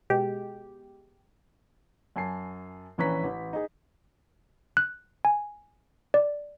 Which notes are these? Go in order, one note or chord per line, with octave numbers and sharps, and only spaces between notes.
B2 G#3 G4
F#2 G#5 A5 C7
A#1 E3 C#4 B4 A#5 B6
A1
D#4 G#4
F#6
G#5
D5